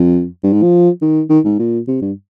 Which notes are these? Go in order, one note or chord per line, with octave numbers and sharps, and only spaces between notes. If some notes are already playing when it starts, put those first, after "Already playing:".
Already playing: F2
G2
G#2
F3
D#3
D#3
G#2
A#2
C3
G2